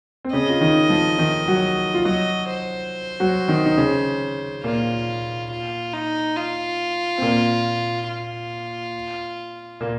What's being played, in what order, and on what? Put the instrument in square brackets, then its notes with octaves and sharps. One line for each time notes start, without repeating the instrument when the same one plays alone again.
[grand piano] C4
[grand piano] C#3 C#4 [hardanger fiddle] D#5
[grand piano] F4
D#3 D#4
F3 F4
D#3 D#4
F#3 F#4
F4
[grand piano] F#3 F#4 [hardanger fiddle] D#5
[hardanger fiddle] C5
[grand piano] F#3 F#4
D#3 D#4
D#4
C#3 C#4
[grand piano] A#2 A#3 [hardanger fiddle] F4
[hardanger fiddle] F4
D#4
F4
[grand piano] C4
A#2 A#3
[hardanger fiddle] F4
[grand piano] A#2 A#3